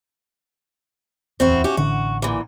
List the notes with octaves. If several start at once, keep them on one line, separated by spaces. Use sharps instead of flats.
D1 E2 C4 E4 F#4
C#4 F#4 G4
A1 D3 D4 F#4
A#2 E3